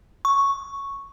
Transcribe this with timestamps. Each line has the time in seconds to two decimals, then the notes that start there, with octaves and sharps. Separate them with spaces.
0.25 C#6